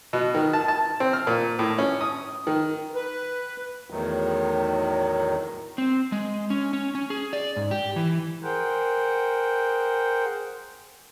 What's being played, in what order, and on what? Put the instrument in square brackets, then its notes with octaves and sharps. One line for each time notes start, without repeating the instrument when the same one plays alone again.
[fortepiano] B2
D#3
A5
A5
C4
F6
A#2
A2
C#4
D#6
D#3
[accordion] B4
E2 A2 D#3 F#3
[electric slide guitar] C4
G#3
C#4
C#4
C#4
G#4
D5
G#2
G4
E3
[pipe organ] G#4 A#4 C5 F#5 G5